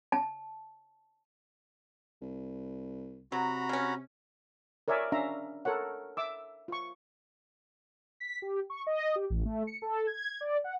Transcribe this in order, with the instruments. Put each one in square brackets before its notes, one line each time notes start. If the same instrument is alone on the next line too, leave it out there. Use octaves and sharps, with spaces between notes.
[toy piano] A5
[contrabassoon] C2
[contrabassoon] C3 [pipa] F#3 [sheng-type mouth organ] F#4 A#5 B5
[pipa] C#3 C#4
[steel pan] A#4 C#5 D5 E5 G#5
C#4 D4 E5 F5 A#5
A4 A#4 C#5 F#5
E5 D6 E6
F4 C#6
[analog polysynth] B6
G4
C#6
D#5
G4
A1
A3
C#7
A4
G#6
D5
F#5